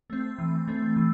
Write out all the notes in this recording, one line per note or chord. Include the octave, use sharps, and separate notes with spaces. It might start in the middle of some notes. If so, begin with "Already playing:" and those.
A3 C4
E3
A3 C4
E3